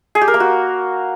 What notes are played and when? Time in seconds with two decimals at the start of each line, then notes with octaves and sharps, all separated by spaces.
0.15 G#4
0.21 G4
0.28 A#4
0.34 A#3
0.40 F#4